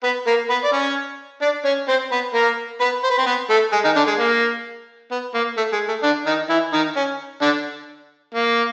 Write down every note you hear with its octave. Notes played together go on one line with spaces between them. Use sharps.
B3 B4
A#3 A#4
B3 B4
D5
C#4 C#5
D4 D5
C#4 C#5
C4 C5
B3 B4
A#3 A#4
B3 B4
C5
B4
C4 C5
B3 B4
A3 A4
G#3 G#4
D#3 D#4
D3 D4
G#3
A#3
B3
A#3
A3
G#3
A3
D3 D4
D#3 D#4
E3 E4
D#3 D#4
C#4
D3 D4
A#3